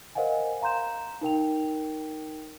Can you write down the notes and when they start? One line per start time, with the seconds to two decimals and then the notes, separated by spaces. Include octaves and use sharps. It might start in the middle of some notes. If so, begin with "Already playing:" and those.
0.15 A#4 C5 D#5 F5 F#5 G#5
0.61 F5 A#5 C6 G6 E7
1.21 D#4 A#4 G5 F7